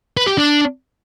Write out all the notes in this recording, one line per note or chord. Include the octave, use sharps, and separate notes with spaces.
B4
G4
D4